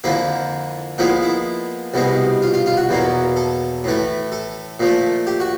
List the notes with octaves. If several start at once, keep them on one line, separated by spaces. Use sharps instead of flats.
F2 D3 F3 A#3 E4
A#2 F3 G#3 B3 E4
E4
C2 B2 G#3 C4
F4
F4
F4
F#4
E2 B2 F#3 A#3
A4
A2 E3 A3
A4
A#2 F3 A3
G4
F#4